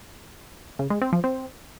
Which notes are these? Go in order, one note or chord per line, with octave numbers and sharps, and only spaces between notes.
C#3
G#3
C4
F3
C4